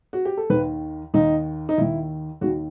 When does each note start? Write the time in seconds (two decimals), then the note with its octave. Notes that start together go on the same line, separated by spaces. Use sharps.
0.13 F#4
0.25 G4
0.37 A4
0.50 D#2 D#3 B4
1.14 D#2 D#3 D#4
1.69 D#4
1.78 D#2 D#3 E4
2.41 D#2 D#3 F#4